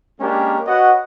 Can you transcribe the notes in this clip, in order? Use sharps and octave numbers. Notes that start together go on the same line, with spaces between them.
G#3 A#3 C#4 D4 G4 A#4
F#4 B4 C#5 D#5 F#5